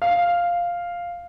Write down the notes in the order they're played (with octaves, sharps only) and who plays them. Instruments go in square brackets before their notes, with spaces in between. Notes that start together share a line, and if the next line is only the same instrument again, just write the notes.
[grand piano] F5